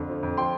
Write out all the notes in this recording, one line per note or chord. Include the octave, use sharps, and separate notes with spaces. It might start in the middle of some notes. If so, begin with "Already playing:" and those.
Already playing: F2 D3
F3
F2
F3 G5 C6